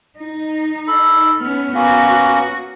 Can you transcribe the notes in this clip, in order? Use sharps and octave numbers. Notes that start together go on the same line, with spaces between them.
D#4
A4 B5
B3 C#4 F6
A#3 B3 C#4 F#4